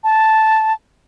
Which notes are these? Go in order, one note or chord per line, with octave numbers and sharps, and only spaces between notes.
A5